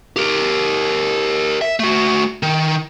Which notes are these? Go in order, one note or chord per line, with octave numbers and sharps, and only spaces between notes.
G4 A#4
E5
A3 F#4
D#3